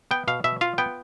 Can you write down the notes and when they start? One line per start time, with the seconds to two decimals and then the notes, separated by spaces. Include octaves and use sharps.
0.11 B3 G5
0.28 B2 F5
0.44 B2 E5
0.61 F4 F5
0.78 B3 G5